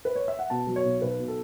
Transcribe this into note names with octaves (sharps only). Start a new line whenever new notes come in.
B4
C#5
E5
F#5
B2 A5
F#3
C#5
B1
B1 B4
B2
A4